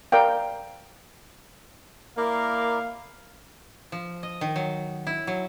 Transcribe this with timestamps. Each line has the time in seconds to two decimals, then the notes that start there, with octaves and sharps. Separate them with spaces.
0.12 A#4 D5 F5 G5
2.17 A#3 E4 A#4 D5 F5
3.92 F3
4.23 D#5
4.41 D#3
4.56 F#3
5.07 E4
5.27 F#3